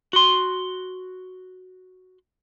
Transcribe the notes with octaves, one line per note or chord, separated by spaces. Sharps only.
F#4 C6